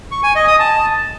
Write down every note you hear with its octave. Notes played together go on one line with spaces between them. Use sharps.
C#6
G#5
D#5
D#6
A5